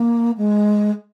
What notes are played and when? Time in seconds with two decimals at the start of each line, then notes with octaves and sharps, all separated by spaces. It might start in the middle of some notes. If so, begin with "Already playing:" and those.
Already playing: A#3
0.38 G#3